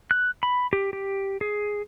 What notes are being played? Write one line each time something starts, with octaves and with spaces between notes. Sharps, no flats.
F#6
B5
G4
G4
G#4